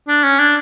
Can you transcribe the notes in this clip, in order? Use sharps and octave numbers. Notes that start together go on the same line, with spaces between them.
D4
C#4
D4